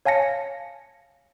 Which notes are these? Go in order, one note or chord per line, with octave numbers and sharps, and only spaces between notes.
C#5 F5 G#5 A5 A#6 C#7